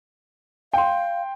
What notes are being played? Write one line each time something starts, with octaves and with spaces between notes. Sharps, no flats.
F5 G5 C6